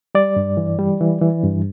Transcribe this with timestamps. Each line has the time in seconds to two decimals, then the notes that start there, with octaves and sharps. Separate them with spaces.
0.15 G3 D5
0.36 G2
0.57 E3
0.79 G3
1.01 E3
1.21 E3
1.43 G2